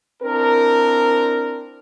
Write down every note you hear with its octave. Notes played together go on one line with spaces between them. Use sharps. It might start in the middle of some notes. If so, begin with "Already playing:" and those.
C4 D4 E4 A#4